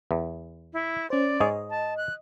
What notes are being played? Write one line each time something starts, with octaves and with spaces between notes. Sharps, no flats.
E2
E4
C#4 C5 D5
G#2 G#4 C#5 D#5
A5
F#6